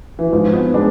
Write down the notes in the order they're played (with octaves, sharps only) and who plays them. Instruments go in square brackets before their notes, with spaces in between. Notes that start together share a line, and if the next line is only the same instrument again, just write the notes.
[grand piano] E3
[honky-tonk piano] G#2 [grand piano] F3
[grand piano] B3
[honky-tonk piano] G#3 B3 [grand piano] D4